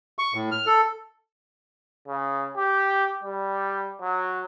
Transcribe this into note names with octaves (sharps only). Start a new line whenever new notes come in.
C#6
A2
F6
A4
C#3
G4
G3
F#3